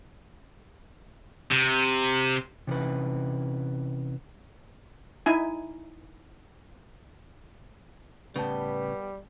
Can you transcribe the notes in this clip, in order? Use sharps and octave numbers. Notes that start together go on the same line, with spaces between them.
C3
C3 E3 C#4 B4
D#4 E4 G#5
A2 C#3 G3 B3 B4 G5 A5